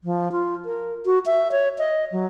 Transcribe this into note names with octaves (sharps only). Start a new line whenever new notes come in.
F3
F4
A#4
F#4
E5
C#5
D#5
F#3